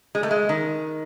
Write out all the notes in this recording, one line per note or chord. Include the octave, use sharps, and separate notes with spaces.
G#3
A3
G#3
D#3